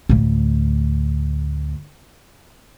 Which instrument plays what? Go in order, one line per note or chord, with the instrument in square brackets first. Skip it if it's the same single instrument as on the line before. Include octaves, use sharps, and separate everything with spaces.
[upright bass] D2 A2